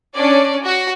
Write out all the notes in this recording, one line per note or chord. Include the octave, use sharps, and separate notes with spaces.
C#4 D4 D5
F#4